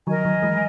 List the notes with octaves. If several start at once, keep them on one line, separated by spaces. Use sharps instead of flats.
D#3 F#3 A#4 D#5 G#5
D#3 F#3
E3 G#3